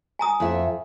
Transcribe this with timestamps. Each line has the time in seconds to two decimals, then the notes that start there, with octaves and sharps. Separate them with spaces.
0.19 G#5 A#5 D#6
0.40 F2 E5